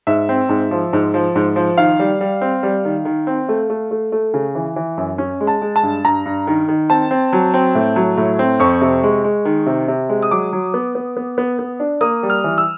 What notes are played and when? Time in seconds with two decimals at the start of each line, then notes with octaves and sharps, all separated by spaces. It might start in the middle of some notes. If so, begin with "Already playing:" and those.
0.07 G#2 E5
0.29 C4
0.49 G#2
0.71 F3
0.93 G#2
1.14 F3
1.36 G#2
1.56 F3
1.78 D#3 F5
1.99 G3
2.21 G3
2.41 C4
2.63 G3
2.85 D#3
3.05 D#3
3.27 C4
3.49 A3
3.70 A3
3.91 A3
4.12 A3
4.34 C#3
4.55 E3
4.76 E3
4.98 F#2
5.18 C#4
5.40 G#3
5.47 A5
5.62 G#3
5.76 A5
5.83 G2
6.04 G2 A#5
6.26 G2
6.47 D#3
6.68 D#3
6.90 C4 A5
7.11 C4
7.33 F#3
7.54 C4
7.75 A2
7.96 F#3
8.17 A2
8.39 C4
8.60 F2 C#6
8.81 C3
9.03 G#3
9.24 G#3
9.45 D#3
9.66 C3
9.88 C3
10.09 G#3
10.22 D#6
10.31 F#3 D6
10.53 F#3
10.74 B3
10.95 B3
11.17 B3
11.38 B3
11.59 B3
11.80 D4
12.01 A#3 D#6
12.23 G3
12.30 F6
12.44 E3
12.58 E6